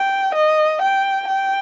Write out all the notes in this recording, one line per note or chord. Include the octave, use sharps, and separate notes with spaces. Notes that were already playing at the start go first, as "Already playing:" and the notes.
Already playing: G5
D#5
G5
G5